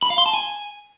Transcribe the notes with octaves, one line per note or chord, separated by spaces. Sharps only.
B5
F5
C6
A5
G#5